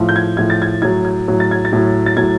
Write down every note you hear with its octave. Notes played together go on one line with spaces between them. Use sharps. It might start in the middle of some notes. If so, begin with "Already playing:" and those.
Already playing: A2 F3
G6
G#6
A2 F3 G#6
A6
G#6
A2 F#3 G#6
G#6
A2 F#3
A6
G#6
A6
A2 F#3
A6
A2 F#3 G#6